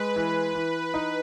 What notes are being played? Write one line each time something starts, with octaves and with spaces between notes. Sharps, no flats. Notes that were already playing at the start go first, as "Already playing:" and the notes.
Already playing: G#3 B4
E3
E3
D#4